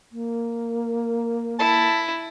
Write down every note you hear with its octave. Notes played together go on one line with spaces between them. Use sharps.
A#3
E4 A5